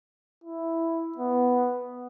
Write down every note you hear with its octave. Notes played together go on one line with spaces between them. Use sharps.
E4
B3